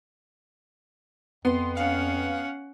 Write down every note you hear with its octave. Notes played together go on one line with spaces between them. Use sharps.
F2 B3 C6
C#4 F5 F#5